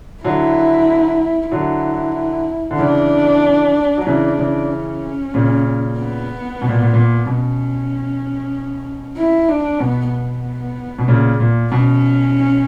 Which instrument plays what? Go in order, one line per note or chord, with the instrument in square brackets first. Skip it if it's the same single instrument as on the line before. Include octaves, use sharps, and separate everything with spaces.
[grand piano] D3 F#3 [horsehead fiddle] E4
[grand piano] D3 F#3 [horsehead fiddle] E4
[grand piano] D3
[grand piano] C#3 E3 [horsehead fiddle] D4
[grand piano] F#3
[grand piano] C#3 E3 [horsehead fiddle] D4
[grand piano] C#3 E3
[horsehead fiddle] C#4
[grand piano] A#2 C#3
[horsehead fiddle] B3
[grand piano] B2
A#2
A#2
A#2
[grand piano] B2 [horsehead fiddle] C#4
[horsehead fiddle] E4
D4
[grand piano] B2 [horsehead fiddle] B3
[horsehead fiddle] B3
[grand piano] B2
A#2 C#3
A#2
[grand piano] B2 [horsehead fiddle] C#4